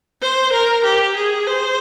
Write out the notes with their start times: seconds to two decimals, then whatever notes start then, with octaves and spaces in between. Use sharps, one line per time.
0.21 C5
0.52 A#4
0.84 G4
1.16 G#4
1.47 C5